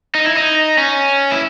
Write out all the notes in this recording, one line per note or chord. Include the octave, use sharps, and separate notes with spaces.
D#4
E4
D#4
C#4
E4